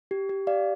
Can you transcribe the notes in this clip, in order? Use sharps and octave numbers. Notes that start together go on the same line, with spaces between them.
G4
G4
G4 D5 F5